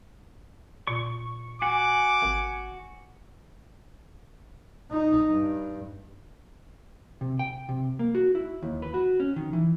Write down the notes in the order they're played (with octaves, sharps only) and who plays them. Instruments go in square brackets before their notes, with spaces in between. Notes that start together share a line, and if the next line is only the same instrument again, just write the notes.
[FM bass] A#2 [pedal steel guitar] C#6
[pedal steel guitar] F#4 [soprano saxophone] G#5 [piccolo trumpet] D6
[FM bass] G#1
[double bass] D#4
G2
[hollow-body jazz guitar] C3
G5
C3
A#3
F#4
E4
D#2
B4
F#4
C#4
D#3
E3